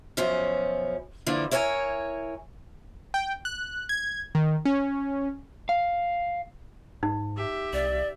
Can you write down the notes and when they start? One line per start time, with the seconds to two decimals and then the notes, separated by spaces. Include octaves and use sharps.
0.17 F#2 B2 F3 C#4
1.26 D3 E3 F3 A#3 D4
1.51 E4 A#4 C#5 D5 G#5
3.14 G5
3.45 F#6
3.89 G#6
4.35 D#3
4.66 C#4
5.69 F5
7.03 G#2 D#4
7.37 G4 E5
7.73 C2 D5